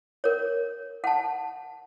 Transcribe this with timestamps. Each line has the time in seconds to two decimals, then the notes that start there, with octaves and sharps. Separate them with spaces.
0.24 A#4 C#5
1.04 F#5 A5